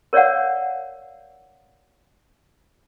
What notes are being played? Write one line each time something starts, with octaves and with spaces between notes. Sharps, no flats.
A#4 C#5 D5 F5 F#5